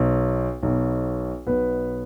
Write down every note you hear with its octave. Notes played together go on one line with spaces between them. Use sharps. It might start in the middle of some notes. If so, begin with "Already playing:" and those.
Already playing: B1 B2
B1 B2
B1 B2 B3 B4